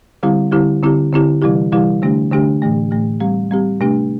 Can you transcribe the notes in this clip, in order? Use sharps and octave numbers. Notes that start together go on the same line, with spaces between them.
D3 G3 C4 E4 G4
D3 G3 C4 E4 G4
D3 C4 E4 G4
D3 C4 E4 G4
C3 E3 G3 E4 G4
C3 E3 G3 E4 G4
D3 A3 D4 G4
D3 A3 D4 G4
A2 E3 A3
A2 E3 A3
G3 C4 G4
G3 C4 G4
C3 A3 D4 G4